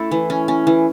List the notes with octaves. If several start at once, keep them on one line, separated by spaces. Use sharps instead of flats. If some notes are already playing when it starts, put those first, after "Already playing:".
Already playing: A3 C#4 E4 A4
E3
C#4
C#4
E3